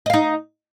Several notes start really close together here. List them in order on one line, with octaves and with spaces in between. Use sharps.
D#5 F5 D#4